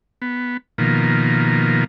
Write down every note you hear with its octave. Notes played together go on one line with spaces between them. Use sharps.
B3
B2 D#3 F3 A#3